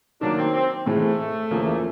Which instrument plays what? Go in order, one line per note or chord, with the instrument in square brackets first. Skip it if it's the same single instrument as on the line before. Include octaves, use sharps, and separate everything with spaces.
[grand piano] D#3 F#3 A#3 [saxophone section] D4
[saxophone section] C4
C4
[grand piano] A2 E3 G#3 C4 [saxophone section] A3
[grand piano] E2 C#3 F3 A#3